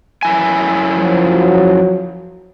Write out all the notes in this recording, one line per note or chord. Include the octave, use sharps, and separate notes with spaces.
F#2 E4 G#5
F3 F#3